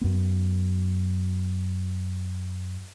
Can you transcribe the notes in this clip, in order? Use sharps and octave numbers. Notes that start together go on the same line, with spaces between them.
F#2 B3